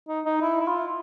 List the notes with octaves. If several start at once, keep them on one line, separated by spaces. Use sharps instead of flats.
D#4
D#4
E4
E4
F4